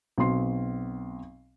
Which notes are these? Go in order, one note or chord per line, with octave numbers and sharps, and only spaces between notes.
B1 F#3 C4 C6 C7